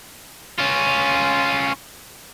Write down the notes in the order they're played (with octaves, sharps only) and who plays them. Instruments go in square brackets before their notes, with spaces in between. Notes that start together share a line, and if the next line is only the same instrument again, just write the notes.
[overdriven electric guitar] C#4 F4